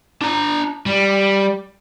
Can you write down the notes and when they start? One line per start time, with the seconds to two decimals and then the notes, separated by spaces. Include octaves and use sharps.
0.21 D4 A#5
0.86 G3